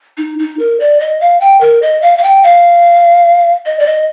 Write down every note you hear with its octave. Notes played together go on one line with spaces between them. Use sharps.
D#4
D#4
A#4
D5
D#5
F5
G5
A#4
D#5
F5
F5
G5
F5
D#5
D5
D#5